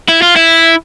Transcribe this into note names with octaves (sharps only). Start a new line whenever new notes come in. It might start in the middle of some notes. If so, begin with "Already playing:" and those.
E4
F4
E4